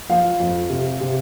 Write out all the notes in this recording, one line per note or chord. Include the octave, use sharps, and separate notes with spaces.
F3 F5
F2
C3
C3